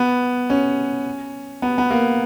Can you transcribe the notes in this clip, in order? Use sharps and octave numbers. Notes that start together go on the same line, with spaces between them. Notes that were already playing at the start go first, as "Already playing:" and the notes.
Already playing: B3
C#4
B3
B3
A#3